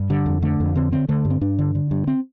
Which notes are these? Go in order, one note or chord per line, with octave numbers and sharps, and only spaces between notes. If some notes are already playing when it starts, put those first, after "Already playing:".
Already playing: G2
D3 G3
F2
D3 A3
F2
D3 C4
D3 C4
D3 A3
G2
C4
G2 D4
D3
D3
G2
C4